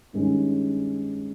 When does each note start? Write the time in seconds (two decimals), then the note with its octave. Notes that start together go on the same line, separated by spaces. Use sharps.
0.13 G2 D#3 G#3 C#4